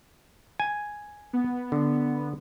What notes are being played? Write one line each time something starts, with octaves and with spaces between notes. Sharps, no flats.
G#5
B3
D3